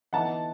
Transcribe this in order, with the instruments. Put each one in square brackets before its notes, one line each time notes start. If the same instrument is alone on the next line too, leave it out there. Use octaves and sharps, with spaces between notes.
[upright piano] E3 B3 D#4 F#5 A5